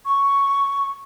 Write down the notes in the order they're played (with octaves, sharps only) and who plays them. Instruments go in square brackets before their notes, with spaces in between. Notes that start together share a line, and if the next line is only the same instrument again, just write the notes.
[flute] C#6